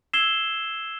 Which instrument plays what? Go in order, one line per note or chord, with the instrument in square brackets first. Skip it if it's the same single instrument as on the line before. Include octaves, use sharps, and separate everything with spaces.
[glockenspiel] E6 G#6 C7 E7 G7